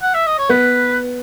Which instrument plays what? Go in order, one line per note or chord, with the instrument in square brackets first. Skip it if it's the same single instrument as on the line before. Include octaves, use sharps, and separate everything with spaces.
[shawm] F#5
E5
D#5
C#5
[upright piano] B3 [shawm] B4